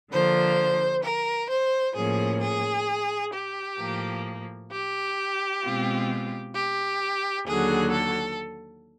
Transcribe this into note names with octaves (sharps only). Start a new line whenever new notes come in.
D3 F3 A#3 C5
A#4
C5
A2 F3 A#3 C#4 G#4
G#4
G4
A2 F3 A#3
G4
B2 G#3 C4 F4
G4
D#2 D3 F#3 G#4
A4